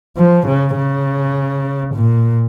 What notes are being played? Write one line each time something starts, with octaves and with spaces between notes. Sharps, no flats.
F3
C#3
C#3
A#2